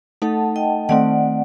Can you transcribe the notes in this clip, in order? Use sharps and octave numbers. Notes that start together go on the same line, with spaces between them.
A3 D#4 A4 F#5 A5
D#5 G5
D#3 A3 C4 D5 F#5